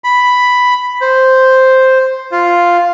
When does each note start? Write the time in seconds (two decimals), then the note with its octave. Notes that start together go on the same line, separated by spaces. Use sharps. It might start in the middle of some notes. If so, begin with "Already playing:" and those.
0.04 B5
1.01 C5
2.32 F4